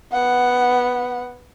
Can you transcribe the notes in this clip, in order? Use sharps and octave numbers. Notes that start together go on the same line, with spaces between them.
B3 F#5